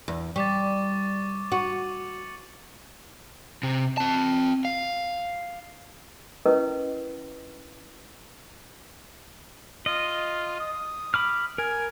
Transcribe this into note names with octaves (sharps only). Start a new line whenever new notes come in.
E2
G3 C#6 D6 A6
F#4 C#7 D#7 F#7
C3
C4 A5
F5
C#4 E4 A#4 B4 D#5 D#6
F4 D#5
D#6
B5 D6 F6
A#4 G#5